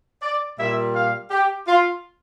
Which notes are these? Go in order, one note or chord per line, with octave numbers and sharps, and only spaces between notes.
D5
A#2 G3 E5
F5
G4
F4